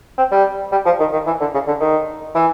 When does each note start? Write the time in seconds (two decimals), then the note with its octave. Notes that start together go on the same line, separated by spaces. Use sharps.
0.18 C4
0.32 G3
0.72 G3
0.86 F3
1.00 D#3
1.13 D#3
1.27 E3
1.40 D3
1.54 C#3
1.67 D3
1.80 D#3
2.35 E3